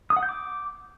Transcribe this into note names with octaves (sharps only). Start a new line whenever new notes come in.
D#6
F#5
G6
D6